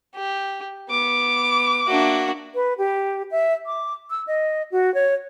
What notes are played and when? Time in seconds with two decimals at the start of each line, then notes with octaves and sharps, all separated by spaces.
0.16 G4
0.90 B3 D6
1.87 A#3 D4 F#4 E5
2.55 B4
2.78 G4
3.31 E5
3.66 D6
4.10 E6
4.27 D#5
4.72 F#4
4.94 C#5